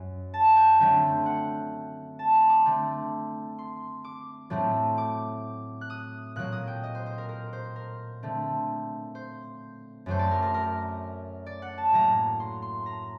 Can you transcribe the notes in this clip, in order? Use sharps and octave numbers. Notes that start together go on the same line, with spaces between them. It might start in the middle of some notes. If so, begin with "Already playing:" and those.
Already playing: F#2 F#3
A5
G5
D3 F#3 A3 C4 G5
F#5
A5
C6
D6
D3 A3 C4
C6
D6
A2 F#3 A3 C4
D6
F#6
D#6
A#2 F#3 A#3 F#6
D#6
G5
D#5
C5
C5
A#4
A#4
C5
A#4
D3 A3 C4
C5
F#2 F#3 A3 C5
D5
A#4
A#4
A#4
D5
F#5
A5
A2 F#3 A#3 A#5
C6
C6
A#5